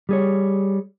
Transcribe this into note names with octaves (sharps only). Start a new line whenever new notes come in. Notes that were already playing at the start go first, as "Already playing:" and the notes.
G3 G#4 C#5